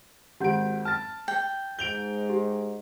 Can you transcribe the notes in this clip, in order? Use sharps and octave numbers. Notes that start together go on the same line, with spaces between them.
G#1 G4 F#5 G6 D7
A5 F6 A6
G5
G#2 G6 D7 F7 G7
G4